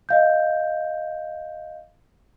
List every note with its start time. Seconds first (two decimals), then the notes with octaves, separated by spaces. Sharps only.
0.09 D#5 F5 G6